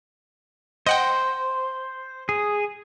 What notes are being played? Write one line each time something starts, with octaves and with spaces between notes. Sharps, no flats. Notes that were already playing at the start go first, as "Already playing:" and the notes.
C5 D#5 F#5 G5
G#4